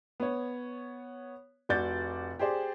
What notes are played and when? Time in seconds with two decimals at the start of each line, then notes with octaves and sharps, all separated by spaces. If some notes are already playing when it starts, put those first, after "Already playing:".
0.20 B3 C#5
1.69 F1 F#4 D5 G6 A6
2.39 G4 G#4 C5 D5